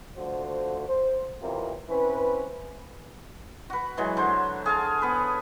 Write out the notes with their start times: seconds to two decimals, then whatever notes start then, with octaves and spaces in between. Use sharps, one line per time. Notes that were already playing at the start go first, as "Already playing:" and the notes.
0.17 D3 F3 A3 F#4 C5
0.88 C5
1.42 B1 C3 E3 C4 F4 A#4
1.89 C4 C#4 E4 B4
3.70 F#4 B4
3.97 E3 F#3 G#3
4.17 D3 C5 C#5
4.66 G#4 F5 A5
5.02 B3 B4